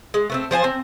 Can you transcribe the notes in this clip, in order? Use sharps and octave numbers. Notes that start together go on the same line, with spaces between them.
G#3
A3 B3 C4
F3 C5 G#5 A5
C4